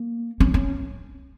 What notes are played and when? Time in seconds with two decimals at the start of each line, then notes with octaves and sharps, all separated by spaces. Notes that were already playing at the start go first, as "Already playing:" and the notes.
Already playing: A#3
0.40 C#4
0.54 C#4